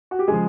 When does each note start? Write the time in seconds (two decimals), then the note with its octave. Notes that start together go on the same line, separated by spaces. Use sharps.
0.11 F#4
0.19 G4
0.28 C#3 F3 G#3 G#4